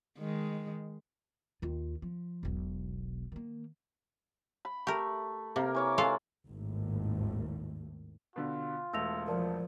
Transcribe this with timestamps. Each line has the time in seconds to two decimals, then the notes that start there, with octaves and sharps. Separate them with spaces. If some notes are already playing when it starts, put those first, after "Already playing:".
0.18 D#3 G#3
1.62 D#2 F4
2.02 F3
2.43 E1 B1
3.32 D#3 A#3
4.65 B5
4.87 A3 G4 A#4
5.56 C3 A#3 A#4
5.75 E3 C#5 D6
5.98 G#3 F4 A4 F5
6.48 G#1 D#2 A2
8.36 B2 D3 F4
8.93 E1 A3 E6 A#6 F7
9.28 F3 A#4 D5 A5